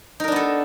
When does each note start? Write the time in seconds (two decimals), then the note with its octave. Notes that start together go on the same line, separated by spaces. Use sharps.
0.20 D#4
0.24 A#4
0.28 D4
0.32 B3
0.36 A4